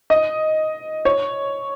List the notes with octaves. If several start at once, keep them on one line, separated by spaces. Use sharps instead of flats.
D#5
C#5